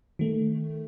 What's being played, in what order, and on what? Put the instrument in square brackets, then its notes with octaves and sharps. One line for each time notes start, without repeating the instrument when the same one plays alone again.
[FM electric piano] D#3 A3